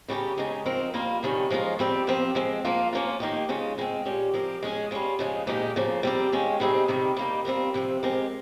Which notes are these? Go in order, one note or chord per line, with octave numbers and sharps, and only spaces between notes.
C#3 G3 C#4 G4 A#4
C#3 G#3 D#4 G#4
F3 C4 D#4 A#4
G3 A#3 F4 A#4
C3 D#3 G3 C#4
F3 G#3 C#4 F4 A#4
G3 C4 G4
F3 C4 G4 A#4
F3 G#3 C4
F3 A#3 F4
F3 A#3 C#4 F4 A#4
D#3 A#3 D#4 G4
C#3 G#3 C#4 F4
D#3 G#3 C4
A#2 G3 C#4 G4
F3 C4 G4 A#4
G#3 C#4 G#4
G3 C#4 F4
C#3 F3 G#3
A#2 G#3 D#4 G4
C#3 F3 A#3
G3 C4 G4 A#4
D#3 G#3 C#4 F4
C3 G3 C4 D#4 G#4
C3 D#3 G3
G3 A#3 D#4
G3 C4 F4 A#4
C3 F3 C4
G#3 C4 G4 A#4